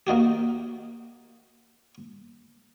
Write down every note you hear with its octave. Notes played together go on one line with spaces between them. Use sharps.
A#3 D#4 F#4 G4